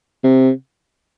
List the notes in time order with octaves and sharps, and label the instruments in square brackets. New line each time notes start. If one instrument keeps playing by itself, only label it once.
[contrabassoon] C3